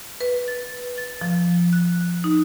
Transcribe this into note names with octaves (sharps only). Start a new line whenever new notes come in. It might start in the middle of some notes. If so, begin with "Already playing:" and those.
B4
A6
A6
F3
F#6
D#4